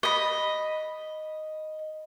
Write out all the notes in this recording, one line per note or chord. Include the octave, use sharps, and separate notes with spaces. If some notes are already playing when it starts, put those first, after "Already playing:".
D#5 B5